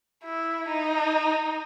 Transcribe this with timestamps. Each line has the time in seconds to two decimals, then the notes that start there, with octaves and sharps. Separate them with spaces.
0.25 E4
0.69 D#4